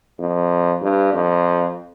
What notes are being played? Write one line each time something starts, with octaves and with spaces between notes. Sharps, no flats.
F2
G2
F2